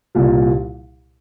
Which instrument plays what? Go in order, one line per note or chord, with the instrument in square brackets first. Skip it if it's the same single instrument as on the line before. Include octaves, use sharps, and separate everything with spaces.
[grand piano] C2 A#2 G3